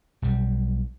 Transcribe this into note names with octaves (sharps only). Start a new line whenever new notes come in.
B1 G3